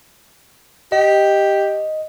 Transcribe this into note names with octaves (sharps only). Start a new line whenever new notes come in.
G4 D#5